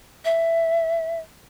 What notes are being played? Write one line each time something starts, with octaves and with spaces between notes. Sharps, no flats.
E5